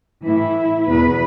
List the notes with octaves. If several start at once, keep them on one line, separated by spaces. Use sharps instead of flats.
A2 E3 E4
E2 B2 B4